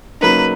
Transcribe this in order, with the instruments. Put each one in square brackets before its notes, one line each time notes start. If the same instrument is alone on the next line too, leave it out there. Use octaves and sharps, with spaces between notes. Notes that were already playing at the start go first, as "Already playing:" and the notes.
[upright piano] C#3 F#3 A#3 D#4 [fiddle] B4